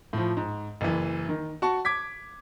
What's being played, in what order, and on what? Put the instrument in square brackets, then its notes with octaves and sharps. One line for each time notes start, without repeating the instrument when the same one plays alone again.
[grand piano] A2 F3
G#2
F#1 E3
D#3
F#4 A5 C#6
D6 G#6 B6